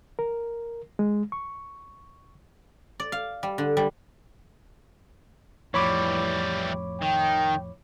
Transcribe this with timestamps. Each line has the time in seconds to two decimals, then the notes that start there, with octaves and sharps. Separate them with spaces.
0.19 A#4
0.99 G#3
1.32 C#6
3.00 D5
3.12 F5
3.43 G3
3.58 D3
3.77 G3
5.74 F2 A2 E3 G3 C#5 B5 D6
7.02 D#3 G5